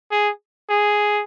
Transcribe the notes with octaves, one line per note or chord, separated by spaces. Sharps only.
G#4
G#4